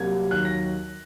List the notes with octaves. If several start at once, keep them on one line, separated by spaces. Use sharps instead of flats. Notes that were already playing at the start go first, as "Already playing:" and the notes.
Already playing: C2 C3 F#3 A#3 G#6
D#2 D#3 F#3 F#6
A#6